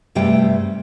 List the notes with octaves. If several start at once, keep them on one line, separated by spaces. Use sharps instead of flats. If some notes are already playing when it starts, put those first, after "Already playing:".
G2 C3 G3 A3 G5